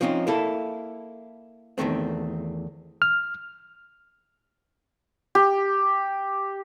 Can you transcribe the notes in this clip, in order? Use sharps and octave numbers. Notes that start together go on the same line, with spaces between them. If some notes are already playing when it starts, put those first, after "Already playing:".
F3 C4 C#4 D#4
A#3 E4 A4
E2 G#2 D#3 A3 C4
F6
G4